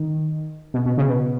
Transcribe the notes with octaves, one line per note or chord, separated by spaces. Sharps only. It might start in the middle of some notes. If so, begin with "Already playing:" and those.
Already playing: D#3
B2
B2
C#3
B2